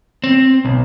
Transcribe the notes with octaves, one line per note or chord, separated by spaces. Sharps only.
C4
B1